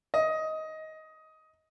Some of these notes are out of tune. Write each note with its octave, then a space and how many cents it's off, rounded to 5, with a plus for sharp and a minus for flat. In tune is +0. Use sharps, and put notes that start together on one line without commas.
D#5 +15